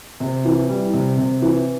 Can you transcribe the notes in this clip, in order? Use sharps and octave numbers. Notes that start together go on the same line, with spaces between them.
C3
E3
G3
C3
C3
E3